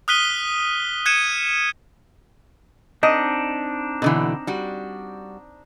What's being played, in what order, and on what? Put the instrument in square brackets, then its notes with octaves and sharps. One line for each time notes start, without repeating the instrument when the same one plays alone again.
[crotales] D#6 F6 F#6 B6 D#7 G7
F#6 G#6 C#7 D#7 E7
[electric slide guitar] C4 D4 D#4 [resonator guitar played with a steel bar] D#5
[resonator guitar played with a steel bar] B2 D3 E3
G3 F#4